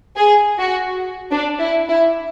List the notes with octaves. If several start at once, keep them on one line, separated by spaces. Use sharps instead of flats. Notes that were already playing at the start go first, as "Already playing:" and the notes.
G#4
F#4
D4
E4
E4